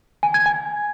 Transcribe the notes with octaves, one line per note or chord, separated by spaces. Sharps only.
G#5
G#6
G#5